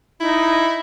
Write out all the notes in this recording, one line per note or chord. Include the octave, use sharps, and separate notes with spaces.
D#4 E4